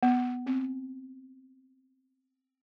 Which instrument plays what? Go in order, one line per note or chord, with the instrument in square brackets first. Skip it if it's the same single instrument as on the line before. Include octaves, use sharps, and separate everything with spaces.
[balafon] B3
C4